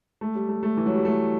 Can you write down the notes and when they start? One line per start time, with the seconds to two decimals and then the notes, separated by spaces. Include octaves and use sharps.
0.21 A3
0.35 G3
0.49 A3
0.63 A3
0.77 E3
0.86 F#3
0.95 G3
1.05 A3